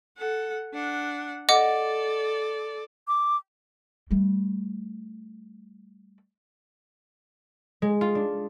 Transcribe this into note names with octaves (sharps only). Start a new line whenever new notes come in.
A4 F#5
D4 F#5
A4 D5 D#5 F#5 D6
D6
G3 A3
G#3
F4
D4